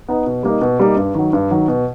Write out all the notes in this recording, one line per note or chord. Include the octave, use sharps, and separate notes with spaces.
B3 D#4
B2
G3 A#3 D#4
B2
G3 A#3 D#4
G2
D#3 F#3
G2
D#3 F#3
B2